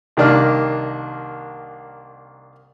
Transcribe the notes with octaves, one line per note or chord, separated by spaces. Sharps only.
C2 D#3 A#3 D4 D#4 F6